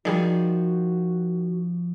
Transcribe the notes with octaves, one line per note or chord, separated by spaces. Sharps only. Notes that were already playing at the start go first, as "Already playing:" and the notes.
D#3 F3 G3 F#4 G#4 D5